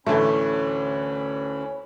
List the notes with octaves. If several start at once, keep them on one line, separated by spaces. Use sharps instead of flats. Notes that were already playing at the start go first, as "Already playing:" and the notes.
D2 A2 D3 E3 A3 C#4 E4 B5